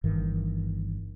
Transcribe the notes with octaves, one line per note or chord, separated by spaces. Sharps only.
G1 G2 D#3 E3